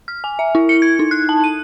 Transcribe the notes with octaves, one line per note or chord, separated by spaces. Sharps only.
F6
G#5
E5
E4
C#7
G#6
D#4
F#6
A5
D#7